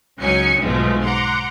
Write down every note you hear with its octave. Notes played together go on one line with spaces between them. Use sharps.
C#2 F#3 C#4 D#4 G#5 C#7
B1 G#2 B2 F3 G#3 A3
F#5 A#5 C6 D6